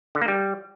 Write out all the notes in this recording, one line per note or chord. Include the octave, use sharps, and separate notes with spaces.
D3
A#3
G3